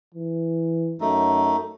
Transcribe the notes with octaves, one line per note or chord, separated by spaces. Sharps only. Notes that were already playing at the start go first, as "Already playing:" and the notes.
E3
F#2 A3 D#4